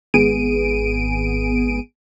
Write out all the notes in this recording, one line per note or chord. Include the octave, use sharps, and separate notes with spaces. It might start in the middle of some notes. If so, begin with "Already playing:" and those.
G#1 B3 G#4 D7 D#7